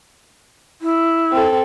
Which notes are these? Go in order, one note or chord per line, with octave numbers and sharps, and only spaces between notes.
E4
C4 A4